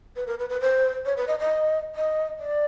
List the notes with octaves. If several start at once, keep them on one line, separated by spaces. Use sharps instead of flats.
B4
A#4
B4
B4
C5
C#5
B4
D#5
D#5
D#5
D5